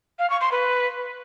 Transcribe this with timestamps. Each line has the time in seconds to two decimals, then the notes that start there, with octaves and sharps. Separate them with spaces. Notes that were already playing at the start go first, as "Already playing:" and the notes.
0.19 F5
0.30 C#6
0.41 C6
0.52 B4